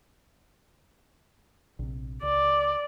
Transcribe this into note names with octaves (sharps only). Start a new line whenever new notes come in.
A#1 C3
C#2 D5